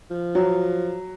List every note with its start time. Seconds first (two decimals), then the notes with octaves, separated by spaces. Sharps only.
0.11 F3
0.35 F#3